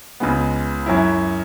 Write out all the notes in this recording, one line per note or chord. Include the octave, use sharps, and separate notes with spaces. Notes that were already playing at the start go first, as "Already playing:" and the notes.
C#2 C#3 G#3 B3
F#2 F#3 E4